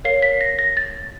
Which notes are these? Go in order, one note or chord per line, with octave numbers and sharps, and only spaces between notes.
A#4 C#5 F5 C7
B6
A#6
A#6
A6